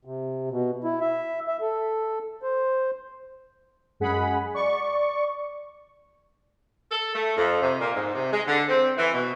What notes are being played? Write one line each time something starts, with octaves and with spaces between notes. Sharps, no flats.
C3
B2
E4
E5
E5
A4
C5
F#2 G#3 G#4 F#5 B5
D5 C#6
A4
A3
F2
C3
A#2
G#2
C3
G#3
D3
C4
E3
B2